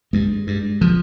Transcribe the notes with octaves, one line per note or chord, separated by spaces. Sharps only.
G2 G#3
G2
F3